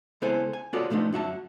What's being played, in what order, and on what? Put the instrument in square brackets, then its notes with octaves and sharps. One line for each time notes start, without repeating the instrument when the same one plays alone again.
[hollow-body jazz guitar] C#2 B3 E4 A4 C5 G#5
G#5
B3 F4 F#4 A4 C#5 D5
A#2 F3 A3 B3 D4 D#4
F#2 F#4 E5 A5